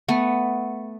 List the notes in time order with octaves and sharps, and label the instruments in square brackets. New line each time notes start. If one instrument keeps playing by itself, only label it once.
[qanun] A3 B3